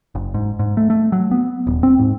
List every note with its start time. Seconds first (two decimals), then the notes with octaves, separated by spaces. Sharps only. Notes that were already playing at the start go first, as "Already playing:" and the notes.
0.15 F#1
0.34 G#2
0.59 G#2
0.77 A3
0.90 A3
1.12 F#3
1.31 B3
1.67 D#1
1.83 C4
1.99 G#2